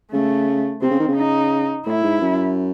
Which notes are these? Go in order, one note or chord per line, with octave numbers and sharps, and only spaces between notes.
C#3 A3
C3 C4
C#3
D#3
C#3
D#4
A2 E4
G#2
F#2